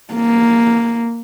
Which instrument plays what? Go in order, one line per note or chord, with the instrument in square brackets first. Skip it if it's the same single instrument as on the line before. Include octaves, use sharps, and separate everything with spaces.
[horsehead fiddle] A#3